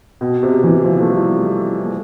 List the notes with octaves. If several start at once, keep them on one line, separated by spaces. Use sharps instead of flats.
B2
C3
E3
F3
A3
G3
A3